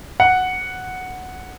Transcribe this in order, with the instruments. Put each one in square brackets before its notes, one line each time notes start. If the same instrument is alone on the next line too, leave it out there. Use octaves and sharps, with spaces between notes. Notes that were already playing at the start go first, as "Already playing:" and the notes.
[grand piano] F#5